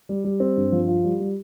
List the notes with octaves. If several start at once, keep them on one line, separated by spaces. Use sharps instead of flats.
G3
G3
C4
G2
F3
F4
G3
G3